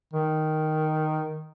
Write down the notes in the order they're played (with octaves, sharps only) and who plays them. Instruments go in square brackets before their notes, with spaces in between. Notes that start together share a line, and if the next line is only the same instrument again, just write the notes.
[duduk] D#3